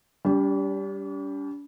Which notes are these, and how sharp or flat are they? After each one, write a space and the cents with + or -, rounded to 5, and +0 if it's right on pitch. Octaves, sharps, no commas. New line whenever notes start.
G3 +0 D4 -45